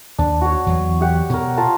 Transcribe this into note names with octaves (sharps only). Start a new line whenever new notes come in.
D#2 D4
F#4 C#5
E2 E3 F#3
G4 F#5 G5
B2 A#4 C#5
F4 A#4 A5